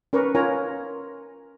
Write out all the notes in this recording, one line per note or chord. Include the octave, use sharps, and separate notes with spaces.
C#4 A#4 B4 A#5 C#6 D6
F4 A#4 C#5 G#5 A#5